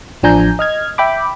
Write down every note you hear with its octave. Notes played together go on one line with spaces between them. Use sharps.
A1 F3 D4 G#5 A#5 G6
D#5 F6 G#6
E5 G5 B5 D6